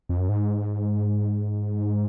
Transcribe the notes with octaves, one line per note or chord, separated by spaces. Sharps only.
F2
F#2
G#2